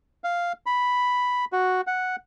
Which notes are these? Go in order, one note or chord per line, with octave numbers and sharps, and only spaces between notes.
F5
B5
F#4
F#5